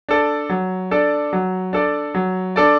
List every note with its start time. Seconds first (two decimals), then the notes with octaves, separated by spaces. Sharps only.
0.09 D4 A4 D5
0.50 F#3
0.91 D4 A4 D5
1.33 F#3
1.73 D4 A4 D5
2.14 F#3
2.56 D4 A4 D5